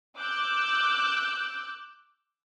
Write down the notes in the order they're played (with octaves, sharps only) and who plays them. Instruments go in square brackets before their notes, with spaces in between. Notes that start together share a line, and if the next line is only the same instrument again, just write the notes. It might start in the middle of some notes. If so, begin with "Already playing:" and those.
[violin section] D6 E6 F#6 G6